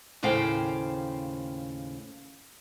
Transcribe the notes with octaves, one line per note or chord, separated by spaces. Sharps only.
D#2 A2 C#3 C5 F5 G5